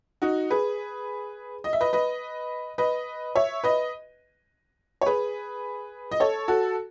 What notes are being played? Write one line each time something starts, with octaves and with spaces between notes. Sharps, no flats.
D#4 F#4
G#4 B4
D#5
E5
B4 D#5
B4 D#5
B4 D#5
C#5 E5
B4 D#5
C#5
G#4 B4
D#5
A4 C#5
F#4 A4